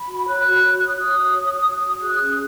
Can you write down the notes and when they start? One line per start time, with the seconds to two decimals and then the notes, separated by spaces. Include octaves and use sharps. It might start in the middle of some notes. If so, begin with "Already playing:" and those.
Already playing: B5
0.09 F#4
0.28 C#5 F#6
0.47 F#4
0.67 F#4
0.86 C#5 D#6
1.05 F#4
1.24 C#5
1.43 C#5
1.62 C#5
1.82 F#4
2.01 G#4 F#6
2.20 C#4